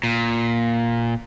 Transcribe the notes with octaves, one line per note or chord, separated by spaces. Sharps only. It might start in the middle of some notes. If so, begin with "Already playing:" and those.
A#2